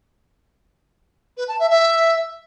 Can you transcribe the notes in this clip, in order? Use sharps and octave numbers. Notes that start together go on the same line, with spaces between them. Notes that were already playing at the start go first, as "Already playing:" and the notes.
B4
A5
E5
E5